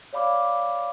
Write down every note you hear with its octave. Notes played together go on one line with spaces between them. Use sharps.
C#5 D5 F5 B5 D6